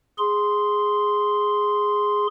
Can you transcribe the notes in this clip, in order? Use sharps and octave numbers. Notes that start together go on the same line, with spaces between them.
G#4 C6